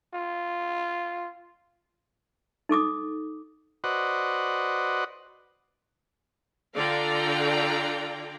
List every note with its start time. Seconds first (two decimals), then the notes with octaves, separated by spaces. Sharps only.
0.14 F4
2.69 D#4 A4 D6 D#6
3.84 F#4 B4 C5 D5 D#5 F#5
6.75 D3 F4 D5 F5 G5 A#5